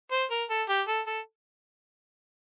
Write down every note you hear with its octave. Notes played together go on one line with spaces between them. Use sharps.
C5
A#4
A4
G4
A4
A4